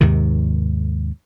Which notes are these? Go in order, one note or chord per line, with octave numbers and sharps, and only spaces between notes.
D#2 G#2 C3 D#3